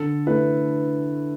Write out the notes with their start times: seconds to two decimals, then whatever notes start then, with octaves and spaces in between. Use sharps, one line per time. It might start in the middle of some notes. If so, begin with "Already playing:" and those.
Already playing: D3 A4
0.26 A3 E4 B4